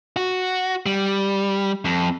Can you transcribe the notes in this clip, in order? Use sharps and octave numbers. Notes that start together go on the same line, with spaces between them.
F#4
G3
F2